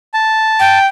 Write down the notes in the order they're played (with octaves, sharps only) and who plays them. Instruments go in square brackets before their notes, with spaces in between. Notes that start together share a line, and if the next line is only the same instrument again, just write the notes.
[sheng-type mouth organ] A5
[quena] G5